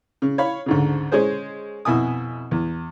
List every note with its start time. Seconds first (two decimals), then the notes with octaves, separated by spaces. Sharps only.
0.22 C#3
0.38 C#5 F5 B5
0.66 D2 G#2 C#3
1.12 G#3 C#4 G#4 C5
1.85 F2 B2 E4 G#5 D#6
2.51 E2